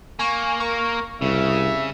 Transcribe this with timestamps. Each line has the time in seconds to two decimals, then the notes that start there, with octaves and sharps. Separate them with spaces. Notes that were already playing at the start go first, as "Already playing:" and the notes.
0.19 A#3 G#5 C#6
0.60 A#4 C#6
1.22 C2 C#3 E5